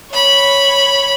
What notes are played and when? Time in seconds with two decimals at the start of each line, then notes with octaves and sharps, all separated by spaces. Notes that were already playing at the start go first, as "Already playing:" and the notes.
0.11 C#5 B5